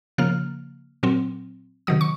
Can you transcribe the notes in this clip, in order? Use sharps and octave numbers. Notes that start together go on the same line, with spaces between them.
C#3 F3 A#3 F6
A#2 F#3 C4
C3 D#3 F#3 D#6
C#6